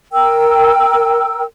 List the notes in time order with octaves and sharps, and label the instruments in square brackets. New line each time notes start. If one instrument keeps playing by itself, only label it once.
[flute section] A#4 G5 E6